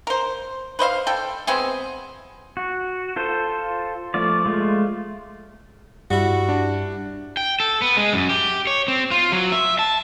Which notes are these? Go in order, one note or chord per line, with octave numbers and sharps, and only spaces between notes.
A#4 C5
B4 C5 D#5 F5
A4 G5
G#3 B3 C4 G#4
F#4
F4 A4 C5
F3 A3 F4 D5
G#3 A3 F4
G2 G3 E4 F#4
D4
G5
A4
B3
G#3
F#2
G4
C#5
C4
F4
F#3
E5
A5